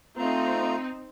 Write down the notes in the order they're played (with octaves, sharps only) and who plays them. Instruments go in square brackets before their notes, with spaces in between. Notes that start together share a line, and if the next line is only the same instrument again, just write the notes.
[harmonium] A3 F4 A#5 [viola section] C4 D#4